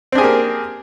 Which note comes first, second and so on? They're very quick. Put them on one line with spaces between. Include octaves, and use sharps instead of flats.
C4 D4 G#4 G4 A#3